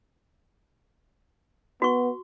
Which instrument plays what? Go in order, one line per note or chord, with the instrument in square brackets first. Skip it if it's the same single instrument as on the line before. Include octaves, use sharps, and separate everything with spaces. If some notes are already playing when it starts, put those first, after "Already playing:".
[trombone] B3 [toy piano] F#4 C#6